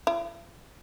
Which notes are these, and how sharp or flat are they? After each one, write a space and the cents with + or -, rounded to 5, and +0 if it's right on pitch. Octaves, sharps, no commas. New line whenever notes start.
E4 +40